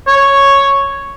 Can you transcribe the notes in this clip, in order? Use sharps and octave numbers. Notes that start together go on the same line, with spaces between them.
C#5